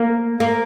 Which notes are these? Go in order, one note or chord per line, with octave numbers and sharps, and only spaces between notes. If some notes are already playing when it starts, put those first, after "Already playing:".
Already playing: A#3
A#3